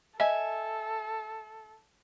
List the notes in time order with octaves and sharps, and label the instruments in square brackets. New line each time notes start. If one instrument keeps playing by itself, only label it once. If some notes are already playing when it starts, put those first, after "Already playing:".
[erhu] A4 [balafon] D#5 [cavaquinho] E5 G#5